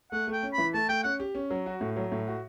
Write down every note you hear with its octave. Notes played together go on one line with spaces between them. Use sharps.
A3 F#5
A3
G5
C#4
B5
E3
A3 A5
A3 G5
C#4 F#5
G4
C#4
F#3
F#4
A2
F#3
A2
F#4